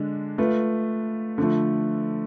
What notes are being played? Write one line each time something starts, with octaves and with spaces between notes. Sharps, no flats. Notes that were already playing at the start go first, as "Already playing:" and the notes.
Already playing: D3 G#3 D4
A3 F4 B4
D3 F3 A3